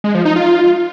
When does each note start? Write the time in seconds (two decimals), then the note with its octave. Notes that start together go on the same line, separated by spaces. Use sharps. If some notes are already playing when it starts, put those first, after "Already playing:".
0.04 G#3
0.15 F3
0.25 D#4
0.36 F4